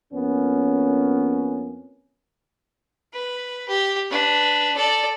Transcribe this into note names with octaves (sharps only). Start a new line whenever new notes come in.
F2 A#3 B3 C#4
B4
G4
D4 B4
A4 D5